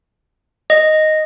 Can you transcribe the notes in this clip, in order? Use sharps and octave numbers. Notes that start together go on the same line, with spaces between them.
D#5